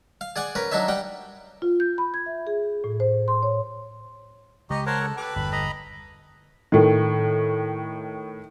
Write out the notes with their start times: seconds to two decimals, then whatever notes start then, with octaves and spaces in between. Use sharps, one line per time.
0.21 F5
0.36 G#4 D5 F#5 G#5
0.55 C#4 A#4 B4
0.72 F#3 D4 D#4 C#5 E5
0.88 G3 F#5 G5
1.62 F4
1.80 G6
1.98 B5
2.14 G#6
2.26 E5
2.47 G#4
2.84 A2
3.00 C5
3.28 C6
3.43 C#5
4.70 C#3 G#3 G4 D#5 A#5 C#6
4.86 A#4 C5 C#5 F#5 A5
5.00 A4
5.17 G4 A4 B4 D6
5.36 G1 E2 B5
5.52 D#5 A#5 B5
6.72 A2 D#3